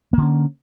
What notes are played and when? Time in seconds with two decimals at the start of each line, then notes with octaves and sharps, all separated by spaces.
0.13 A#3
0.17 D3
0.22 C#4